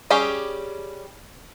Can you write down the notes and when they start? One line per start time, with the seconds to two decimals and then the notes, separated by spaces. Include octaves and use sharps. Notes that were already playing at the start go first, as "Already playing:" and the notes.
0.10 G3 C#4 G4 G#4